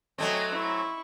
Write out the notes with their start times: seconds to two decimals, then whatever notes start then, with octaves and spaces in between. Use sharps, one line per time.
0.18 F#3 A3 C4 D#5 G#5
0.52 E4 C#6